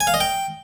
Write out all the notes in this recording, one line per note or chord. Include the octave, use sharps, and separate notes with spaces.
G#5
F5
D#5
G5